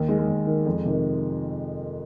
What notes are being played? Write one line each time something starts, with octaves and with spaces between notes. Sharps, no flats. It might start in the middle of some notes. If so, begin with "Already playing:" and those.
Already playing: D#2
D#3 G#3
G#3
D#2
D#3
F2
C3 D#3